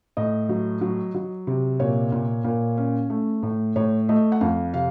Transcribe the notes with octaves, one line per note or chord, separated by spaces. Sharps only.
A2 D#5
F#3
F#3
F#3
C3
A#2 C#5
A#2
A#2
C#4
A3
A2
A2 C#5
A3 D#5
F#5
F2 F5
C3 F5